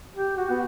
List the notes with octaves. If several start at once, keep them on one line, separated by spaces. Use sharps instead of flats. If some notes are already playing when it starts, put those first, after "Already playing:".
G4
F#4
B3